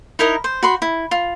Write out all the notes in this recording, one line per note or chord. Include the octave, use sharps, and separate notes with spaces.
D#4 E4 A#4 D#5
C5
F#4 B5 C6
E4
F4